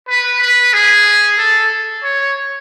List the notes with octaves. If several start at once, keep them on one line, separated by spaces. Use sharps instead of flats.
B4
B4
G#4
A4
C#5